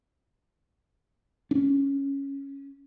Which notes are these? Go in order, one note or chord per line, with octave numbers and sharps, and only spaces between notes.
C#4 D4